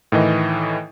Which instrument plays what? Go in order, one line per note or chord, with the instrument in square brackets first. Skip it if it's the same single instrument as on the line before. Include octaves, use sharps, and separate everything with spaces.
[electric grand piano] A2 D#3 E3 D#5